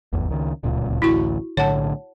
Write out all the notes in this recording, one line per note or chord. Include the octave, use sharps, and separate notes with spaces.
D1 G#1 E2
C#2 D#3
D1 C#2 A#2
A1 D2 E4 F#4 C#6
B1 A2 D3 C#5 F#5 A5